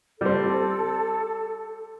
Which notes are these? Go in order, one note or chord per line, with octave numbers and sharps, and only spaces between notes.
G3 C4 A4